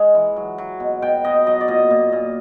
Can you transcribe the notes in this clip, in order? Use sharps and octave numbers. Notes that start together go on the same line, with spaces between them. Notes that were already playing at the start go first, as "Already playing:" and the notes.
Already playing: G#3
E3
F#3
F#3
B2
B2 G5
B2 D#5
F#3 D#5
D5
A#2 D#5
A#2
A#2